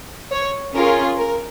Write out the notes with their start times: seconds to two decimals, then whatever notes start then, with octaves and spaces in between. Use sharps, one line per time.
0.31 C#5
0.74 C#4 F4 G#4 A#4
1.17 A#4